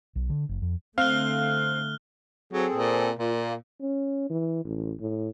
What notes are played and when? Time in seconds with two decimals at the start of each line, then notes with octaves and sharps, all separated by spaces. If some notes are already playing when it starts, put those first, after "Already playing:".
0.16 B1
0.30 D3
0.49 F#1
0.62 F2
0.98 D3 A3 C4 F5 F6 F#6 G7
2.53 F#3 C4 G#4 A4
2.75 A#2
3.18 A#2 F4
3.36 A#3
3.81 C#4
4.30 E3
4.65 A1
5.01 A2